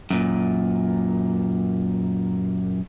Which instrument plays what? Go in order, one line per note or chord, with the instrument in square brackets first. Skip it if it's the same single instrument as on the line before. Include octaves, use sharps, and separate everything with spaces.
[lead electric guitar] F#2 A#2